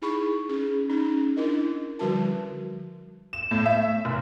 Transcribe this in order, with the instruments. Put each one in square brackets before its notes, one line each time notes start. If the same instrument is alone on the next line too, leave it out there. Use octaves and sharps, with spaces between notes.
[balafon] D#4 E4 G#4 B5 C#6
C#4 G#4
C#4 D#4
D4 E4 A#4 D#5
D3 F3 G3 F#4 A#4 A5
[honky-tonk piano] E7
A2
E5
F1